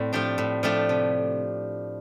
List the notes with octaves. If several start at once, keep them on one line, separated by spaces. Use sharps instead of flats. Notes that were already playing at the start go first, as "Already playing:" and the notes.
Already playing: A2 C4 D5
F3 A3 D4 G4
A2
F3 A3 D4 G4
C3